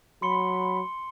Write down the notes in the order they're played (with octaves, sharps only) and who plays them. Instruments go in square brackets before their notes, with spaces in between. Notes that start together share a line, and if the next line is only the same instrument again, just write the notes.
[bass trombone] F#3 [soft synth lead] B5 [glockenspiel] C6 C#7 G7